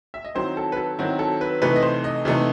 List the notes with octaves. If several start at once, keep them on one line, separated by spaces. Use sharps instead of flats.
E5
D#5
D#3 F#3 C4 E4 C5
A4
B4
A4
D#3 F#3 C4 E4 F#4
A4
B4
C3 E3 A3 D#4 B4
D#5
C5
D#5
C3 E3 A3 D#4